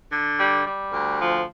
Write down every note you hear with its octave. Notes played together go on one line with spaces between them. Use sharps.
D3
G3
G3
D2
F3